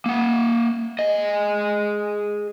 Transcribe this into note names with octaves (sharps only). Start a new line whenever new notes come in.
A#3 F#5
G#4 D#5